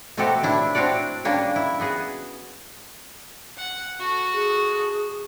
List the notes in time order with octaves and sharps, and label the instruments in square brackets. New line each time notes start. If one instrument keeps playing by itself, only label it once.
[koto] B2 A3 C4 F#4 G4 A4
A2 D4 E4
C4 D4 F#4 C#5 D5
G3 A#3 C#4 D4
E4
B3 F#4 G#4
[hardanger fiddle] F#5
F#4 A4
[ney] G#4